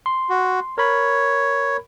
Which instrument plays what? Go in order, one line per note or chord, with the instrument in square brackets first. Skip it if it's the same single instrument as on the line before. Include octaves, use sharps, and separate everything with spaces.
[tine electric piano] C6
[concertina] F#4
[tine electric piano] A#4 B5 [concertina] C#5